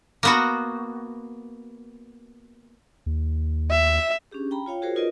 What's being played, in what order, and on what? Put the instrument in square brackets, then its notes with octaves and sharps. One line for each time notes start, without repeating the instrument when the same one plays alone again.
[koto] A#3 B3 F#4
[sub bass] D#2
[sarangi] E5
[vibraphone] C#4 D4 G4 G#4
G5 A#5 B5
F4 C#5 F5 G5
F4 F#4 G#4 A#4 C5 C#5
D#4 F4 A#4 B4 D5 D#5